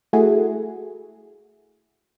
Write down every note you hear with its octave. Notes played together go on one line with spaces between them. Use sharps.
A3 E4 F#4 G#4